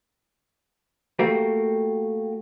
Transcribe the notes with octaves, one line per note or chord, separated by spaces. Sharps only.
A3 A#3 F#4 G4